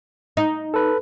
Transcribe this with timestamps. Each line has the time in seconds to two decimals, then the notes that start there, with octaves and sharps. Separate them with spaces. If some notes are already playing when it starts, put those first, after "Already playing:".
0.37 D#4
0.74 A4 B4